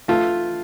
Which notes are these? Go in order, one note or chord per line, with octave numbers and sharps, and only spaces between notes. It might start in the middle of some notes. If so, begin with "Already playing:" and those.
A3 F4